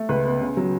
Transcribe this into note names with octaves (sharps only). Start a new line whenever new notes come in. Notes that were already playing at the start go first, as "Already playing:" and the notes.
Already playing: A3
C#2 B4
B3
C#3
F#3